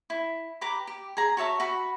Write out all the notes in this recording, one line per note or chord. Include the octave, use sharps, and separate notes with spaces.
E4
G4 B4 A#5 D6
G4
G#4 A#5
F#4 C#5 E5 A5
F#4 F#5 B5